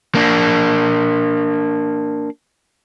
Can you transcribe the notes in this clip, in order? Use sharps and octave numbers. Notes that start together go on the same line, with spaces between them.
A#3 D4